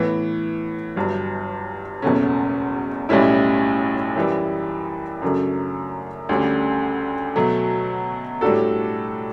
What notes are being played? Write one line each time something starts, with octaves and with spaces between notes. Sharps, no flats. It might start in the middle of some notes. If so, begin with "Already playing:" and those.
Already playing: A2 E3 B3
G1 G2 F#3
F#1 E2 B2 A3 C#4
B1 A2 G3 C#4 E4
F#2 E3 G3
F#2 C#3 F#3 A3 D4
D2 D3 G3 C#4
B2 F#3 A3
A2 G3 D4 F#4 A4